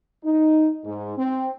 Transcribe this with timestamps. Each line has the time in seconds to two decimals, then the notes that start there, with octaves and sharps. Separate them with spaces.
0.24 D#4
0.84 G#2
1.17 C4